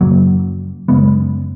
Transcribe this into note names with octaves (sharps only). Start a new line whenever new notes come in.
F#2 C#3 F#3 A#3
F#2 C#3 G#3 B3